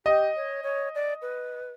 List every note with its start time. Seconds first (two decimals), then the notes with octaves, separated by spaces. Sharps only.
0.06 G4 D#5
0.36 C#5
0.63 C#5
0.95 D5
1.22 B4